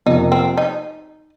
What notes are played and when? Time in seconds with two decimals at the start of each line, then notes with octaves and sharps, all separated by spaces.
0.06 F2 C3 F3 A#3 D#4
0.32 C4
0.57 D#4